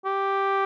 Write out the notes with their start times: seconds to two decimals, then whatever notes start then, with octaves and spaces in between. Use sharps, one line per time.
0.05 G4